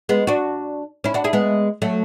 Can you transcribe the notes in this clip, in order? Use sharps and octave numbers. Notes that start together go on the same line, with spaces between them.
G#3 B3
D4 F#4
C#4 E4
D4 F#4
E4 G#4
G#3 B3
F#3 A3